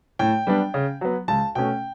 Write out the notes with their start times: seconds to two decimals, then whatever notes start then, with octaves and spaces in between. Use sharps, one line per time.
0.19 A2 G5
0.47 G3 B3 D4
0.74 C#3
1.01 F#3 B3
1.28 C#2 A5
1.55 B2 A3 C#4 G5